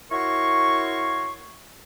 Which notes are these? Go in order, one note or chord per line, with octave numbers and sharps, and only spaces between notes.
E4 F#4 A#4 C#5 C6 C#6